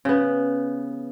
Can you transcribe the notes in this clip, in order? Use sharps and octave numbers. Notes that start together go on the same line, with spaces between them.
C#3 B3